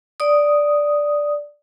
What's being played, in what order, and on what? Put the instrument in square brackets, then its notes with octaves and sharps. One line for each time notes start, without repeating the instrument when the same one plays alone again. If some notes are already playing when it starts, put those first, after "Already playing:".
[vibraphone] D5 D#6